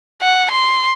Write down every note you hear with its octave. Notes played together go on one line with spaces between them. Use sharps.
F#5
C6